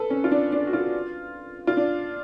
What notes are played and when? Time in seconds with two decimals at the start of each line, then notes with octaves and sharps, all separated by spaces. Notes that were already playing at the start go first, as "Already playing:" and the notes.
Already playing: A4 B4
0.10 C#4
0.24 F4
0.31 D4
0.52 D4
0.67 F#4
0.73 F4
1.67 F4
1.77 D4